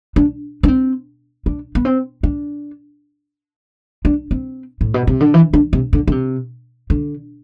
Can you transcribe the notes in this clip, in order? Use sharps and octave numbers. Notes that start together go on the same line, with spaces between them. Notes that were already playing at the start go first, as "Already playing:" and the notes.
D4
D4
C4
D4
B3
C4
D4
D4
C4
A2
B2
C3
D3
E3
D3
C3
D3
D3
C3
D3